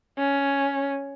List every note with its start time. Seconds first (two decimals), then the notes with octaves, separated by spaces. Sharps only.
0.18 C#4